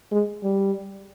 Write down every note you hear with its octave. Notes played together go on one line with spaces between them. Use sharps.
G#3
G3